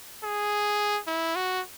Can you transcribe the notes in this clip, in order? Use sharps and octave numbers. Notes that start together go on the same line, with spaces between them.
G#4
E4
F#4